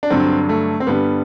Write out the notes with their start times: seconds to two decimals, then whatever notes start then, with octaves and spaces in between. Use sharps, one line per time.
0.03 D4
0.10 G2 D3 F#3 C4
0.49 A3
0.80 C4
0.87 G2 D3 G3 B3